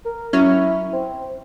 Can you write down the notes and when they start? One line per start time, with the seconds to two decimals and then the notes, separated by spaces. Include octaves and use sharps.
0.05 A#4
0.33 F#3 C#4 E4
0.93 C4